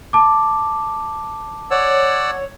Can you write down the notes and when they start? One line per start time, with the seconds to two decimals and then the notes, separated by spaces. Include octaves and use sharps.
0.13 A5 D6
1.71 C#5 D5 F#5 E6